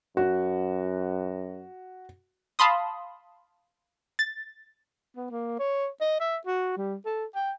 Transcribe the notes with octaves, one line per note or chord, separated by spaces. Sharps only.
F#2 F#4
F5 A5 B5 C6 D#6
A6
B3
A#3
C#5
D#5
E5
F#4
G3
A4
G5